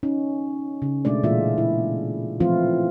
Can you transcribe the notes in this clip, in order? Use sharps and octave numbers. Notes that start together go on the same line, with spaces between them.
C#4 D#4
C#3
B2 G#3 A3 D4 D5
A#2 E3 G#3 F4 E5
E4
E3 F3 A3 C4 E4 F4